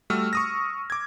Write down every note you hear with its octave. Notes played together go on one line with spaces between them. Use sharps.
G3 A3 F#4 E6 F6
C#6 D#6 A#6
D6 G#6